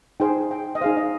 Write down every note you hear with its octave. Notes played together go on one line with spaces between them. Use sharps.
D#4 G#4 C5 G5
G5
D#5
D#4 G#4 C5 F5
D#5